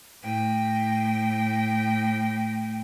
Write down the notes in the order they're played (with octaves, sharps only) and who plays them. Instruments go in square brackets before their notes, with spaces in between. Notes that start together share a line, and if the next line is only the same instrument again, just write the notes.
[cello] A2 G5